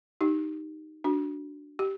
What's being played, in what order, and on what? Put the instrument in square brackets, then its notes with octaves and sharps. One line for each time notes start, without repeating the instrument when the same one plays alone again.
[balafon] D#4 G4
D4 F#4
G4